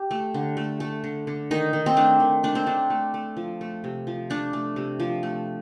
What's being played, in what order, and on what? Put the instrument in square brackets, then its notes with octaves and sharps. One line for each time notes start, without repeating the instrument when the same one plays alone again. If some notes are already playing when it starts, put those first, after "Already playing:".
Already playing: [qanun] G4
A3
D3
A3
A3
D3
D3
D#3 D#4
D#3
C4
A3 D4
D#3
A3 D4
C4
A3 D4
A3
A3
F3
A3
C3
F3
A3 D4
A3
C3
F3
A3